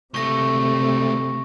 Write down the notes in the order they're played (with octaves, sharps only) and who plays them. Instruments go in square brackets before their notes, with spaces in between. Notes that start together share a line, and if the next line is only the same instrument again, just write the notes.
[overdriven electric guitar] C#2 A3 [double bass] C3 [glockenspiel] C#6 A#6